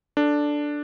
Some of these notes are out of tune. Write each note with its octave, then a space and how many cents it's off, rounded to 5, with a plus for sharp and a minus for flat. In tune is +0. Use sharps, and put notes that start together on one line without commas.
D4 +0 A4 +0